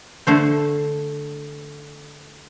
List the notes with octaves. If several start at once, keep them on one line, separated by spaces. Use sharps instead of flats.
D3 A3 C5